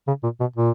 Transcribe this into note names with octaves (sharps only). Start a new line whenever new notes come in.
C#3
A#2
B2
A#2